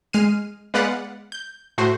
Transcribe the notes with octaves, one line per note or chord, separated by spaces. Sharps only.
G#3 F6 C7 D#7
G#3 B3 B4 D5 F5 F#5
G6
A2 A3 F#4 C5